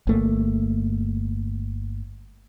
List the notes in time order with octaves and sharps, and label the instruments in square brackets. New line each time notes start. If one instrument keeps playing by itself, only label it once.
[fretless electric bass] G1 A3 A#3